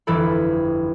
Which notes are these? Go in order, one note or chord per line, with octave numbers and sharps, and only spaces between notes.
G1 F2 E3 G4 A4 B5